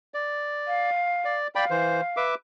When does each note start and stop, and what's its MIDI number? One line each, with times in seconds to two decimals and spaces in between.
0.14 0.90 74
0.67 1.34 77
1.25 1.47 74
1.55 1.65 74
1.55 2.22 77
1.55 1.65 79
1.55 1.65 83
1.71 2.01 52
1.71 2.01 72
2.17 2.35 71
2.17 2.35 76
2.17 2.35 86